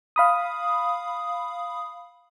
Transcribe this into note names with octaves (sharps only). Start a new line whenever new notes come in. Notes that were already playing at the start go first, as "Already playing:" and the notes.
F5 B5 D#6